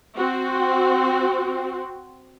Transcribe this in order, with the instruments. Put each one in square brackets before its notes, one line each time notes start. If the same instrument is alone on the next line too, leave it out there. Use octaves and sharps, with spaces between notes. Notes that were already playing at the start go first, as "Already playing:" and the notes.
[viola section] C4 F#4